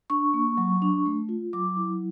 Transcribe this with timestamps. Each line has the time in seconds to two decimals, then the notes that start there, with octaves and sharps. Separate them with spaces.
0.10 D4 C#6
0.34 A#3
0.58 F#3
0.82 D4
1.06 A3
1.29 F4
1.53 F#3 D6
1.77 E4